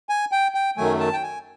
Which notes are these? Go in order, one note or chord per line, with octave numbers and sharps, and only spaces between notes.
G#5
G5
G5
F#2 D#3 F#3 A3 G#5
A5
G5
G#5